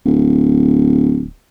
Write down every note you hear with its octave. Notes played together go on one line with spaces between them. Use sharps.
D1